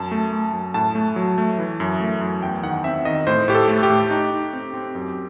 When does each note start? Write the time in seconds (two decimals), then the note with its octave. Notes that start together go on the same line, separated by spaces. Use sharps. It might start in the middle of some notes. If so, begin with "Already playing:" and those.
Already playing: F#2 A5
0.11 A3
0.33 A3
0.53 F#2
0.74 A2 A5
0.95 A3
1.16 F#3
1.38 A3
1.58 E3
1.80 F#2
2.01 A3
2.21 F#2
2.42 E2 G5
2.63 D#3 F#5
2.84 C4 E5
3.05 D#3 D#5
3.27 A2 C5
3.48 A2 G4
3.54 A4
3.68 A3
3.83 G4
3.90 A2
4.11 D#4
4.31 D#4
4.53 C4
4.74 C4
4.95 F#2